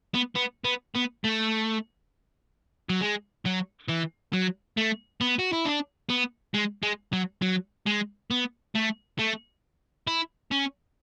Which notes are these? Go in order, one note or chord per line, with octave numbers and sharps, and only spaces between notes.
B3
B3
B3
B3
A3
F#3
G#3
F#3
E3
F#3
A3
B3
F#4
E4
D4
B3
G#3
G#3
F#3
F#3
G#3
B3
A3
A3
E4
C#4